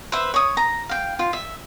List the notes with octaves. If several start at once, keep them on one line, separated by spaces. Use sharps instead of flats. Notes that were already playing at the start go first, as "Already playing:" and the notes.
B4 C5 E5
C#5 D#6
A#5
F5 G5
F4
E5